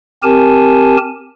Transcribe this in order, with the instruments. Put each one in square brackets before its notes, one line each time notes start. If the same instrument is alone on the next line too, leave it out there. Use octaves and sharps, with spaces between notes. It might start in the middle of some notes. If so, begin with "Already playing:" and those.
[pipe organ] C4 G4 A#4 G#5 A5